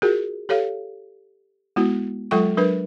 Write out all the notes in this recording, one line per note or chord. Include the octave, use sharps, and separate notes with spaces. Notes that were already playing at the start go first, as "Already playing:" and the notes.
F4 F#4 G#4 A#4
G4 A4 C#5 F5
G#3 B3 E4 F#4
F#3 G#3 F4 A4 G5 C#6
F#3 D4 A#4 B4